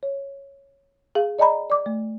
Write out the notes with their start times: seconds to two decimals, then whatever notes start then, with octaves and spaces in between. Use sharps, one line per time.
0.03 C#5
1.15 G#4 F5
1.39 D5 D#5 G#5 A#5 B5
1.70 D5 D6
1.86 A3